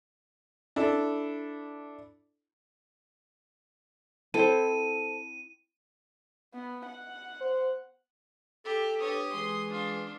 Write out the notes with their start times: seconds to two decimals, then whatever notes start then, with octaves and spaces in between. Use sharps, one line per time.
0.76 D4 E4 A4
4.34 C4 E4 A4 C5 D#7
6.54 B3
6.86 F#5
7.41 C5
8.65 G4 A4
9.00 D4 G4 B4 C#5 D#6
9.32 E3 G#3 G#4 C6
9.69 D4 F4